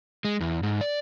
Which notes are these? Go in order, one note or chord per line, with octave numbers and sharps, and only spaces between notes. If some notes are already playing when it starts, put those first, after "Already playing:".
G#3
E2
G#2
D5